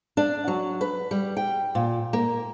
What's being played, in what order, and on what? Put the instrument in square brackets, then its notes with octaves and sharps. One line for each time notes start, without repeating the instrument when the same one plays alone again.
[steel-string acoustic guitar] D4
F#3
B4
G3
G5
A#2
A#3